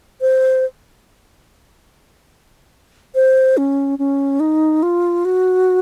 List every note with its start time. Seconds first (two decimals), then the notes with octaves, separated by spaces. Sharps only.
0.21 C5
3.15 C5
3.57 C#4
3.99 C#4
4.40 D#4
4.83 F4
5.25 F#4